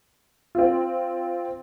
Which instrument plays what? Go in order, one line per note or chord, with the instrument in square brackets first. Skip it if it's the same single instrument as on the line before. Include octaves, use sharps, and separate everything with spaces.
[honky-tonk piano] C4 F4